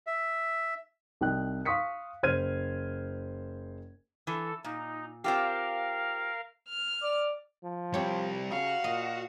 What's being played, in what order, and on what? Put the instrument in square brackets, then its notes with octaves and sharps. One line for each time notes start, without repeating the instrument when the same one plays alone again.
[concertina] E5
[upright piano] C2 D#4 G5 F#6
F5 C6 C#6 D#6 B6 C#7
F#1 C5 F6 G#6 D#7
[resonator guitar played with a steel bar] E3 [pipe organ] A4
[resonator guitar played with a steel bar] A#2 [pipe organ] D#4
[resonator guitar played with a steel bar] C4 F4 G4 [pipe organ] A#4 F5
[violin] F6
[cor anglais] D5
[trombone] F3
[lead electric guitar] G3 C4 [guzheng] G4 C#5
[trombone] C#3 [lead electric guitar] F#4 [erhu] F5
[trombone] A#2 [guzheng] D#5